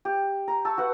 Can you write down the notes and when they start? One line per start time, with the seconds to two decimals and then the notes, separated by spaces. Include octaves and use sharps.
0.05 G4
0.48 A#5
0.65 A5 C#6 E6
0.78 F#4 B4 F#5